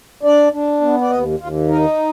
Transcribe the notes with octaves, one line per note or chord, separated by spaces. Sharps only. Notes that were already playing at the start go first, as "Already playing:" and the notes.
D4 D5
D4
B3
D5
D#2 D#5
D#2 F4
D#4 A#4